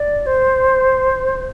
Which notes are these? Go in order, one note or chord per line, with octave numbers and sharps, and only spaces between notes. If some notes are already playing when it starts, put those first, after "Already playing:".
Already playing: D5
C5